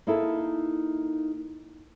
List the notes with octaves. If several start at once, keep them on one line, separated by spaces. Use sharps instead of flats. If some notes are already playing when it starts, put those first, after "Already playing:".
A#3 D#4 E4 G#4 A4